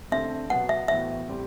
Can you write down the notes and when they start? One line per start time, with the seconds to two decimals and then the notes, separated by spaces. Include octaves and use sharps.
0.12 D3 A3 C4 E5
0.50 B2 F#3 B3 F#5
0.69 E5
0.88 A2 E3 B3 F#4 C5 E5
1.28 A2 G3 C4 G4